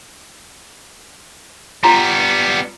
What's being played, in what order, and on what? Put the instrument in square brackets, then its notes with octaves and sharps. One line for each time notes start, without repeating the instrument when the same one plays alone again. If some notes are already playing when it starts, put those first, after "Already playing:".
[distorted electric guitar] G3 B3 [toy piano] F4 A#5 C6